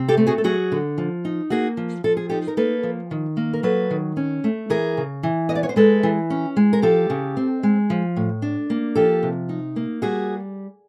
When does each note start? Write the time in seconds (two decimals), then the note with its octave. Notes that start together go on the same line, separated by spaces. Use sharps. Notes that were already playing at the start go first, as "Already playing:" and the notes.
Already playing: C3 C4
0.08 G4 A4
0.17 A3
0.27 F#4 G#4
0.38 A4
0.44 F#3 F#4 G#4
0.72 D3
0.98 F3
1.25 D#4
1.50 A#3 F#4 G#4
1.77 F3
2.04 F3 A4
2.17 G#4
2.29 D#4 G4 A4
2.48 A#4
2.57 A#3 A4 B4
2.83 F3
3.11 D#3
3.37 A#3
3.53 A#4
3.63 F#3 A4 B4
3.91 D#3
4.17 C#4
4.44 A3
4.70 E3 G#4 A#4
4.97 C#3
5.23 E3
5.49 B3 D#5
5.55 D5
5.63 C#5
5.69 C5
5.76 G#3 A4 B4
6.03 E3
6.30 C#4
6.57 G#3
6.73 A#4
6.82 F3 G4 A4
7.10 C#3
7.37 C4
7.63 G#3
7.90 F3
8.16 A2
8.42 D4
8.70 A#3
8.95 F3 G4 A4
9.23 C3
9.49 D#4
9.76 A#3
10.02 G3 F#4 G#4